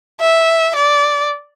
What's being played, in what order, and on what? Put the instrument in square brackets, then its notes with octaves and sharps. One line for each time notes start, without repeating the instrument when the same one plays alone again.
[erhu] E5
D5